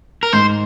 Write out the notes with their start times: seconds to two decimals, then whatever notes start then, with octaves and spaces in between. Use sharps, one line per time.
0.23 A#4
0.33 G#2 C5